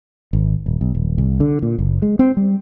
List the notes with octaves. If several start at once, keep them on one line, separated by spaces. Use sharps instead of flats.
G#1
D#1
B1
D#1
C2
D3
A#2
F#1
G#3
C4
G3